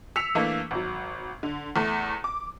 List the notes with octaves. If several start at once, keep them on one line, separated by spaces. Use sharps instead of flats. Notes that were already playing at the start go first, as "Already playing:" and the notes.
E6 B6 C#7 F7
E3 A3 A#3 D4
G#1 F#3
D3
E2 A3
D6